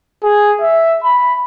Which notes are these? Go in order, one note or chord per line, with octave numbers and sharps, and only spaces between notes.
G#4
E5
B5